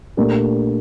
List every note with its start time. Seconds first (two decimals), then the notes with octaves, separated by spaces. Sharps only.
0.17 A#2 A3 D4 G4 A#4